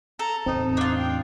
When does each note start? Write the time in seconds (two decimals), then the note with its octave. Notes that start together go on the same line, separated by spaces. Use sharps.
0.19 A4 A#5
0.46 E2 A2 C4 D#4
0.77 D4 F4
0.98 G5